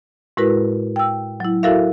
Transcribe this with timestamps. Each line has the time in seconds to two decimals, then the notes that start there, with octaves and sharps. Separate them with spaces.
0.37 A2 G#3 E4 F#4 A#4 B4
0.96 G5 E6
1.40 F#3 E4
1.63 E4 F#4 A4 A#4 E5 F5